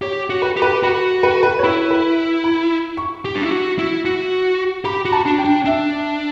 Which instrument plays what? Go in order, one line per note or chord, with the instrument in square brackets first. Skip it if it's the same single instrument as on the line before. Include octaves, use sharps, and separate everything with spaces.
[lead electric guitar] G4 [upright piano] C#5
[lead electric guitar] F#4
[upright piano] B4
[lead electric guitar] G4
[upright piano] B4
[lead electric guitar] F#4 [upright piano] B4
[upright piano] B4
B4
C#5
[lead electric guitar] E4 [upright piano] B4
[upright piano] B4
B5
C#6
[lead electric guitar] G4
D4
E4
F#4
E4
F#4
[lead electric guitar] G4 [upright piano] B5
[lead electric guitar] F#4
[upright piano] A5
[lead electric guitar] D4
[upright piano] G5
[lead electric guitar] D4
[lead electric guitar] D4 [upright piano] E5